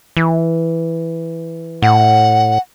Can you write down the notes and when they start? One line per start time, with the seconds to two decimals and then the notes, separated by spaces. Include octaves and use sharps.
0.17 E3
1.82 A2 F#5